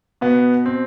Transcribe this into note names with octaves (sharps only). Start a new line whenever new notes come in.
B2 B3
C4